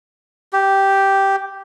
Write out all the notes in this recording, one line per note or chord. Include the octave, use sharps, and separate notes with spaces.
G4